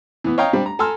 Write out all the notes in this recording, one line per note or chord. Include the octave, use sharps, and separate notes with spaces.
E3 B3
C#5 D#5 F5 G5 A#5
G3 C4 D4
A#5
A4 G#5 A#5 C6 E6 F6